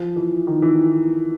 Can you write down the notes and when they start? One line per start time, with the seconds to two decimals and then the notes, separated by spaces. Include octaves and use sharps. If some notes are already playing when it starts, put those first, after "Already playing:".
Already playing: F3
0.16 E3
0.47 D#3
0.62 E3